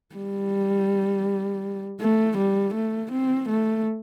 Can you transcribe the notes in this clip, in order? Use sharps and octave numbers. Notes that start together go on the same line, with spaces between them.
G3
A3
G3
A3
C4
A3